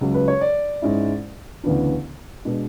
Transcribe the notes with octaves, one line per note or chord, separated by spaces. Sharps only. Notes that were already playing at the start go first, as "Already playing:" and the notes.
C#2 C#3 F#3
B4
C#5
D5
G#2 G#3 C#4 E4
D2 C#3 E3 B3 D4
B2 G#3 B3 D4